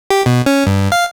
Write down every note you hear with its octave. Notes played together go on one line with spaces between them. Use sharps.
G4
B2
C#4
G2
F5